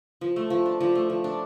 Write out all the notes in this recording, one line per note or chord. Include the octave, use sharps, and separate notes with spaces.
F3
A3
F3
D4
F3
A3
F3
D4